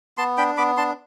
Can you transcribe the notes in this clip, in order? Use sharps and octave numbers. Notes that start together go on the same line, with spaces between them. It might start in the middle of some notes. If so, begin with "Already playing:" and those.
B3 A5 C6
D4 G5 B5
B3 B5 D6
D4 A5 C6